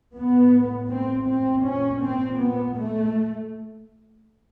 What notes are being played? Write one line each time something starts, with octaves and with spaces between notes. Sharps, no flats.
A2 B3
C4
C4
A#2 C#4
C4
B3
A3